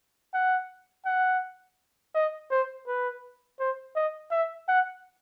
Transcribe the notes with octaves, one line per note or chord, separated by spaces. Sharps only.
F#5
F#5
D#5
C5
B4
C5
D#5
E5
F#5